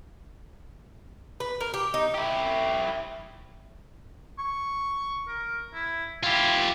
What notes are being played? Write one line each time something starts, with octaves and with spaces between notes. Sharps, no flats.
B4
A#4
G4
D#4
E4 G4
C#6
A#4
E4
E4 F4 G4